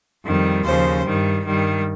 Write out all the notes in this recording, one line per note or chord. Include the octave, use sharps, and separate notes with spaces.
F2 D#3 G3
D#2 C#3 F3 C5
G2 D#3 G3
G2 D#3 G3